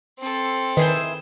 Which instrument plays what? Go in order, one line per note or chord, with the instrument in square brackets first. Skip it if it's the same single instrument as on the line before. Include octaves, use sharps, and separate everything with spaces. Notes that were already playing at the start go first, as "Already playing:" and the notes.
[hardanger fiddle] C4 A4
[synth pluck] D#3 [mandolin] E4 G#4 C5 [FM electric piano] B4